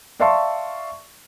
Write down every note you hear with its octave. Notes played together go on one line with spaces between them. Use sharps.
D5 E5 F5 A5 C6 C#6